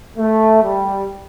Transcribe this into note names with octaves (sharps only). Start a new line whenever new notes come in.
A3
G3